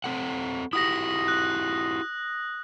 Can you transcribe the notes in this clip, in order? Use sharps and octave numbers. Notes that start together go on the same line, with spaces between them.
C4 A4 F#5
E4 F#4 G4 D#6 A#6
F#6